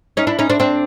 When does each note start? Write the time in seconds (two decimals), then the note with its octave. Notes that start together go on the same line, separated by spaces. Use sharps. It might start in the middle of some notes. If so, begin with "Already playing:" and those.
0.17 C#4 D#4
0.27 D4 E4
0.39 C#4 D#4
0.50 C4 D4
0.60 C4 D4